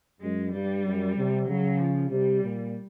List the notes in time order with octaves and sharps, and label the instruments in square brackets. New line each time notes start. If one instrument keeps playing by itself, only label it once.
[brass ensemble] F#2 [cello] G#3
[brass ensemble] G2 [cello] G3
[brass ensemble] F#2
C3
[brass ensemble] C#3 [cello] F#3
[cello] F3
[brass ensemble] C3 [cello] G3
[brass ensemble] A#2